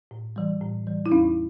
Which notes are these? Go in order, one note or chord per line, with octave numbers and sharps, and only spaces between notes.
A2
E3 G3
A2
E3 G3
E4
E2 C#4 D#4